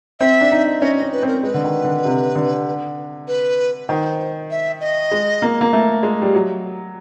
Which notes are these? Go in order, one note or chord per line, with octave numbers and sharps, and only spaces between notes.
C4 E5
D4
D#4
C#4 D#5
D#5
C#4
B4
C4
A#4
G#3 B4
D3
D#3
D3
C3
D3
B4
D#3 C5
E5
D#5
G#3
A#3
A#3
A3
G#3
G3
F#3